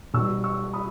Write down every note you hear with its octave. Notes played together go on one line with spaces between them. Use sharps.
B1 B2 G3 C#6 E6
C#6 E6
B5 D#6